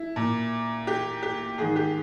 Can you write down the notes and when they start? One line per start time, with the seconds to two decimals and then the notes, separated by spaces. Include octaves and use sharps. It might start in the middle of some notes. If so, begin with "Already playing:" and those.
Already playing: E4
0.16 A#2
0.87 G4
1.22 G4
1.58 G#2 D#3 G#4
1.76 G4